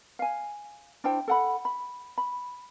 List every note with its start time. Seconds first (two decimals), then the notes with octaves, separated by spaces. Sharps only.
0.19 F5 G#5
1.04 D4 E4 C5 G5
1.28 A4 F#5 B5
1.65 B5
2.18 B5